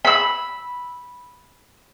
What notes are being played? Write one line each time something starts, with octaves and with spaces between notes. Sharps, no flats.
B5 E6